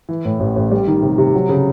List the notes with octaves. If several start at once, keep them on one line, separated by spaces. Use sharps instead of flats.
E3
A2
A1
A1
G3
D#3
C3
C3
F#3
C#3